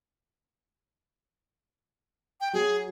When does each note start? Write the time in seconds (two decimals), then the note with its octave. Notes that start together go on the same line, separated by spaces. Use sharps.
2.40 G5
2.53 F#3 G#4